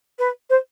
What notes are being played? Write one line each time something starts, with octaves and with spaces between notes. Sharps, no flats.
B4
C5